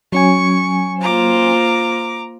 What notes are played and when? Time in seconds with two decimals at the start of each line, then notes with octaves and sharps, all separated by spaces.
0.12 F#3 C#4 G#5 C#6
1.01 A#3 F4 C5 A#5 D6